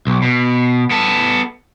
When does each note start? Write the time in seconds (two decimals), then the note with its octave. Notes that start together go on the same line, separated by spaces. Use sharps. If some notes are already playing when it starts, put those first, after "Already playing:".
0.07 B1
0.22 B2
0.91 B3 A4